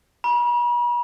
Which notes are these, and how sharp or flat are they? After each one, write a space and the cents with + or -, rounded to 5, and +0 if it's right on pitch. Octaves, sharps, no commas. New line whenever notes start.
B5 -45